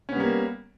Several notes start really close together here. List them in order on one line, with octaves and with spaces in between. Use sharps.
C#4 B3 G3 A#3